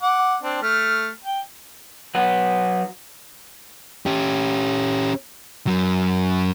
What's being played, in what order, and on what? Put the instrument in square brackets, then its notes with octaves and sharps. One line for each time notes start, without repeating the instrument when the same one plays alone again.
[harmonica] F#5 D6
C4 D4
A3 F6
G5
[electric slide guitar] F#3 B4 F#5
[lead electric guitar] C#4 G4
F#2 F#3